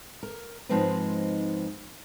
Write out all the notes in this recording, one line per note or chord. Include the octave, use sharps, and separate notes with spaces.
A#4
G#2 F3 G#3 C4 D#4 B4